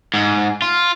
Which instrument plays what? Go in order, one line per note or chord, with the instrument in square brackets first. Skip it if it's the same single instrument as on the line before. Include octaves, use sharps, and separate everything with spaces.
[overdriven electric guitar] G#2
F4